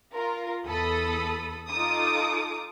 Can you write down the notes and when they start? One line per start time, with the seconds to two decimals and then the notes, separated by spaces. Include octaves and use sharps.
0.15 F4 A#4
0.66 E2 A4 B5 D#6
1.70 D#4 F4 A4 D6 D#6